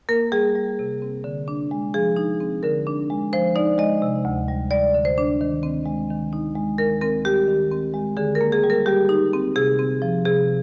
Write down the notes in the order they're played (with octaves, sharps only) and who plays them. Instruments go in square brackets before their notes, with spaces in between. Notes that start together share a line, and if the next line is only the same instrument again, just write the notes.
[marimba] A#3 A#4
G3 G#4
G3
C3
C4
D3
D4
G#3
F3 G#4
D#4
C4
D3 A#4
D4
G#3
F3 C5
D#4 D5
G#3 D#5
C3
D2
G3
G3 D5
D3
C5
D4
D#3
C4
G#3
D#3
D#4
G#3
D#3 A#4
C4 A#4
G3 G4
D#3
C4
G#3
D3 G#4
A#4
A#3
G#4
G3
A#4
G3 G4
D#4
C4
C3 G#4
C4
F3
C3 G#4